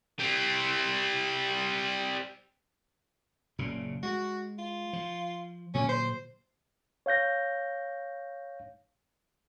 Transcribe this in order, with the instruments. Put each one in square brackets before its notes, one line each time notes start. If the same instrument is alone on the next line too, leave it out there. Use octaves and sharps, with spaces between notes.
[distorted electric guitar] G3 C4
[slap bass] F#1 A#2 C#3
[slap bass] G#3 [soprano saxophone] F#4
[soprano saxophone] F4
[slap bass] F3
[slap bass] A#2 D3 F#3 [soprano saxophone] C#4
[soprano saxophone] C5
[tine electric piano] C#5 F5 G6 A#6